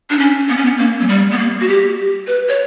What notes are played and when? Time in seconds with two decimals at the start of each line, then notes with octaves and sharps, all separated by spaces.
0.10 D4
0.19 C#4
0.49 B3
0.57 C#4
0.66 B3
0.79 A#3
1.01 F#3
1.08 G3
1.32 B3
1.38 A#3
1.61 F#4
1.68 G4
2.27 B4
2.49 C#5